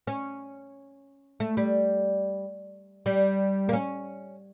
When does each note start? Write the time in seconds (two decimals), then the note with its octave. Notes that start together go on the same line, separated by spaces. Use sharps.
0.07 C#4
1.40 A3
1.57 G3
3.06 G3
3.69 A#3
3.73 C#4